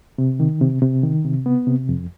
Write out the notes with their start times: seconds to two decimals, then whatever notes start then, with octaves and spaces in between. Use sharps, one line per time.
0.18 C3
0.40 D#3
0.61 C3
0.82 C3
1.03 D#3
1.25 C3
1.46 B3
1.67 C3
1.89 F2